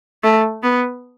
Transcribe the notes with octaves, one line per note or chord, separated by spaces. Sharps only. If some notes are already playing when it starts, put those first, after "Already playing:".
A3
B3